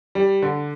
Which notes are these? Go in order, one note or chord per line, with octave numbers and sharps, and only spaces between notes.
G3
D3